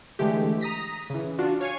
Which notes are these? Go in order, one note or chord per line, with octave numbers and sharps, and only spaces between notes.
D3 E3 G#3 A3 G4
A#5 D#6 A#6 B6
C#3 E3
D4 F4 F#4
C#5 F5 G#5 C#6